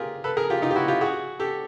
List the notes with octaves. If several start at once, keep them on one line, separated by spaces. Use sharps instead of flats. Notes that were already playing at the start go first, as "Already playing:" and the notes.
Already playing: F4 G4 G#4 A#4
A4 B4
G#4 A#4
F4 G4
D#4 F4
G4
E4 F#4
F4 G4
F#4 G#4
G4 A4